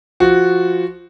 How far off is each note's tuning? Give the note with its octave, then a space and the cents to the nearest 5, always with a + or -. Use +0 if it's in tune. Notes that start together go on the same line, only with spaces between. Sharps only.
F3 +0 F#4 +0